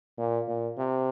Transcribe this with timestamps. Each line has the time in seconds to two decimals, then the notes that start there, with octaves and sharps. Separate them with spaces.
0.18 A#2
0.47 A#2
0.77 C3